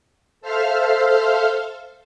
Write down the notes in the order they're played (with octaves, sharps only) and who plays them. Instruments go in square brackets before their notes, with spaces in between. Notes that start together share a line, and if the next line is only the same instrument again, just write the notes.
[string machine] A4 C5 E5 F5 F6